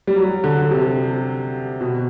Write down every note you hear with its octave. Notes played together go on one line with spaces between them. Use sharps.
G3
F#3
D3
C3
B2